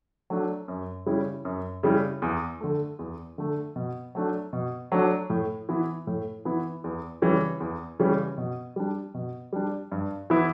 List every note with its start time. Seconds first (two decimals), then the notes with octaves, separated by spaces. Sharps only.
0.30 F#3 A3 D4
0.68 F#2
1.06 C#3 G3 C#4 E4
1.45 F#2
1.83 C#3 G3 C#4 E4
2.22 E2
2.60 D3 A3
2.99 E2
3.38 D3 A3
3.76 B2
4.15 F#3 A3 D4
4.53 B2
4.92 F#3 A3 D4
5.30 A2
5.69 E3 B3 E4
6.07 A2
6.45 E3 B3 E4
6.84 E2
7.22 C#3 E3 G3 C#4
7.60 E2
8.00 C#3 E3 G3 C#4
8.38 B2
8.76 G3 D4
9.14 B2
9.53 G3 D4
9.91 G2
10.30 E3 B3 E4